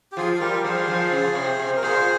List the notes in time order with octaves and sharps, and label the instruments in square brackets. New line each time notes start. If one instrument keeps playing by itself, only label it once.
[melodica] G4
[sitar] F3 [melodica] F4 G#4
[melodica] G#4
[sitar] G3 [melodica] G4 A#4
[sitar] F3 [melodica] G#4 C5
[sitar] G3
F3
C#3
C3
C3
[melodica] A#4
[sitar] A#2 [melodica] G#4 C5